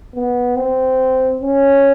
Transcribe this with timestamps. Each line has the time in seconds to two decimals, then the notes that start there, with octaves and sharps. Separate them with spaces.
0.15 B3
0.56 C4
1.41 C#4